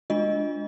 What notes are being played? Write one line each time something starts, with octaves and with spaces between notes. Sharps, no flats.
G#3 D4 F4 D#5